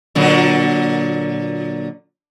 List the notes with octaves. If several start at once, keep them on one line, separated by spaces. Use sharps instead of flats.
A#2 D3 F#3